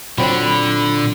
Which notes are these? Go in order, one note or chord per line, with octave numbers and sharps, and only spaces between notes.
A#2 D3 F#3 C4 B5